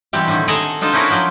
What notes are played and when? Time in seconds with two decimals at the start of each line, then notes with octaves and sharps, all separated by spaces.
0.13 B2 E3 G3 C4 G4
0.27 A2 D3 D#3
0.48 G#4 A4 D#5 F#5 G#5 A#5
0.81 D4 D#4 F4 A4 C5
0.93 C#4 D#4 E4 F#4 A#4 B4
1.10 F3 F#3 C5 D5